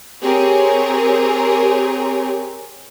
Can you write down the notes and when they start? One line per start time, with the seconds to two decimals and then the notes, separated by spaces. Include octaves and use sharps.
0.22 C4 G4 G#4 A#4 C#5